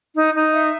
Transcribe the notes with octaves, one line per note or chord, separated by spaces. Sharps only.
D#4
D#4
E5